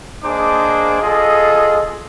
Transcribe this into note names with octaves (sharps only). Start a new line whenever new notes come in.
A#3 D4 G#4 C5 D#5 D6
F4 G#4 A4 D#5